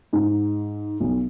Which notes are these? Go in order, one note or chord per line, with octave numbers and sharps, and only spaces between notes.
G#2
B1